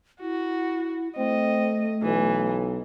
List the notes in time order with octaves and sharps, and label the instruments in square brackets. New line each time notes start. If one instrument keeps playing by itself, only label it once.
[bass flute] E4 [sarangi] F#4
[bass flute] A3 [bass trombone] C4 [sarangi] D#5
[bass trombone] B1 [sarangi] E3